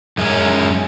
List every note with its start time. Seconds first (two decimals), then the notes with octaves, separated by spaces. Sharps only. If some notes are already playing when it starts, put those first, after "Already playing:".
0.18 F#2 G#3 C#4